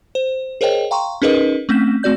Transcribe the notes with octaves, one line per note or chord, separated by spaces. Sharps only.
C5
G#4 A#4 C5 C#5 D#5 G5
F5 G5 A#5 C6 C#6
C#4 D#4 G#4 A#4 B4 D#5
A3 C4 C#4 G6 B6 E7
A3 C4 F#4 D5 G6